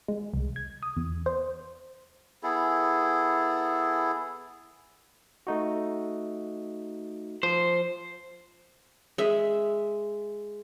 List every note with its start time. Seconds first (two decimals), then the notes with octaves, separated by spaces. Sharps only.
0.08 G#3
0.34 C2
0.56 G#6
0.83 D#6
0.97 E2
1.26 C5
2.43 B3 E4 G#4 A4
5.47 A3 D#4 F#4
7.43 F3 C5
9.18 G#3 E5